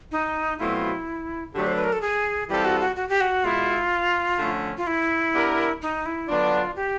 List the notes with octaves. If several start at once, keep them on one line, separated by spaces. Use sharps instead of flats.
D#4
B2 F#3 A3 C4 E4 F4
D3 F#3 A3 D4 G4
C5
B4
A#4
A4
G#4
E3 G3 C4 F4 G4 A4
F#4
F#4
F#4
G4
F#4
B2 G#3 B3 E4 F4
D3 F3 A3 C#4 F#4
F4
E4
B3 D4 G4 A#4
D#4
E4
D3 F#3 B3 D4 F4
G4